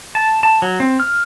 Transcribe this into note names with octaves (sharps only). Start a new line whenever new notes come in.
A5
A5
F#3
C4
F6